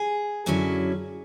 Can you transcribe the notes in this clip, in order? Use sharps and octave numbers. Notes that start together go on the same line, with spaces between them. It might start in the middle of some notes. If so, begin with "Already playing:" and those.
Already playing: G#4
F#2 D3 F#3 C#4 E4